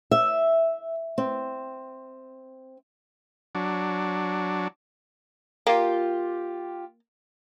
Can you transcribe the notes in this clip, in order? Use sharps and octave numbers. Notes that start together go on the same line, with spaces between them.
E5
C4
F#3 D4
A#3 F4 G4